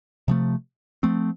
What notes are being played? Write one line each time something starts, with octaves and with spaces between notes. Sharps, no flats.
C3 F3 A3
F3 A3 C4